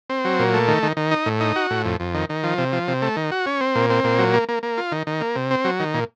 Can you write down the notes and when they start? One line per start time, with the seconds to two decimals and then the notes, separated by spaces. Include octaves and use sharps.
0.10 C4
0.24 F#3
0.39 A#2
0.54 A3
0.68 D#3
0.83 D#3
0.97 D#3
1.11 D#4
1.26 A2
1.40 D#4
1.56 F#4
1.70 A2
1.85 F2
2.00 F2
2.14 D#3
2.29 D#3
2.43 F3
2.58 C3
2.72 F3
2.88 C3
3.02 A3
3.16 D#3
3.32 F#4
3.46 C#4
3.61 C4
3.75 A#2
3.90 C4
4.04 A#2
4.19 F#3
4.33 A#3
4.49 A#3
4.63 A#3
4.78 F4
4.92 D#3
5.07 D#3
5.21 A#3
5.36 C3
5.51 C4
5.65 F#3
5.80 D#3
5.94 A#2